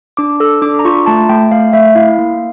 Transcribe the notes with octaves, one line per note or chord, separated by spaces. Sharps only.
D4 D6
A4 E6
D4 D6
A#5
F4 C#6
A3 A5
A3 G5
A3 F5
A3 E5
E4 F5
A#3